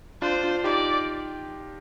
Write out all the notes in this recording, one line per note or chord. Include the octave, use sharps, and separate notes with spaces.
D4 F4 C5
D4 F4
D#4 G4 D5